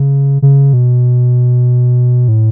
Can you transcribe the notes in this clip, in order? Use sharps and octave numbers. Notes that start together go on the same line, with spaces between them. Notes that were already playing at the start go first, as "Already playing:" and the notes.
Already playing: C#3
C#3
B2
A2